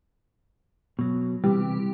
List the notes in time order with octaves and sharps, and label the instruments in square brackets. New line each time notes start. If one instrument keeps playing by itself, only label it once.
[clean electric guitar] B2 F#3
[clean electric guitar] C3 E3 [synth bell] G3